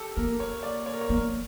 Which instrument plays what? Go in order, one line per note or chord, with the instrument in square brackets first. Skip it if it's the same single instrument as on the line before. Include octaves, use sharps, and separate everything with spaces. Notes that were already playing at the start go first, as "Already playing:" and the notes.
Already playing: [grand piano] G4 A4
[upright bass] A#3 [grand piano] A#4
[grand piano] C#5
D5
C#5
A#4
C#5
[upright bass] A#3